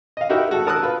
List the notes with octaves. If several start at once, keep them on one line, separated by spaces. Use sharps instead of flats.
D#5 F5
D#4 E4 F#4 G4 A#4 E5
G#3 F#4 A4
A#4 A5 D#6 E6 F#6
F4 B4